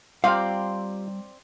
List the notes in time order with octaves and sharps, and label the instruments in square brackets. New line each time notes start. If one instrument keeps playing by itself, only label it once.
[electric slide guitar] G3 A#5 [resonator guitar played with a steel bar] C4 C5 D5 [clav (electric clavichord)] F4 G4 [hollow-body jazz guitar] F5